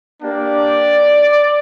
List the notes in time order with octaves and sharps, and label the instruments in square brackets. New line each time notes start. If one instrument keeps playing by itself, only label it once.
[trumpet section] A#3 D4 G4 D5